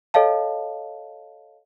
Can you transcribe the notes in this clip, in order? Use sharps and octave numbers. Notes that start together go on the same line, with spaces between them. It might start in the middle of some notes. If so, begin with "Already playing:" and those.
A4 C#5 D#5 F5 A5